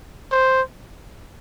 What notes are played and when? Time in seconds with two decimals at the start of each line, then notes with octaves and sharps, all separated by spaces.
0.32 C5